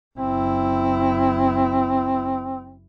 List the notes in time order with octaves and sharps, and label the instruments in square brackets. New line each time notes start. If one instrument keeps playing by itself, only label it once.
[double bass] F#1 E4 [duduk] C4